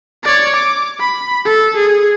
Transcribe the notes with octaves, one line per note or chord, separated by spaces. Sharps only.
C#5 D5
D6
B5
A4
G#4